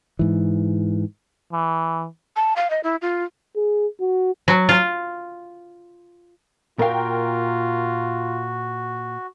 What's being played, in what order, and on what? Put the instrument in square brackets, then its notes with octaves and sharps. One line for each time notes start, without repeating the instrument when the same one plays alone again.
[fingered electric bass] G#2 E3
[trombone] E3
[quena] A5
F5
D#5
E4
F4
[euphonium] G#4
F#4
[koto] F#3
F4
[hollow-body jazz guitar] A#2 F5 [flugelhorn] F4 [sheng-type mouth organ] F#4 [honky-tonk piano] A#4 G5